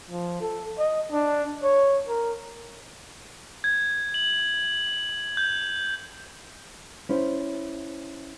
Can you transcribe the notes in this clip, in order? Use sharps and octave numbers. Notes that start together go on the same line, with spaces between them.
F3
A4
D#5
D4
C#5
A#4
G#6
F#7
G6
C#4 E4 C5